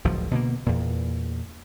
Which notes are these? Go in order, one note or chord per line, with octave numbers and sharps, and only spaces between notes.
F#1 C#2 A2 F3
B2 D3 G#3 A#3
E2 A#2